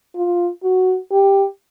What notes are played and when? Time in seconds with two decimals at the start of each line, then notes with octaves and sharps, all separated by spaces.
0.16 F4
0.63 F#4
1.11 G4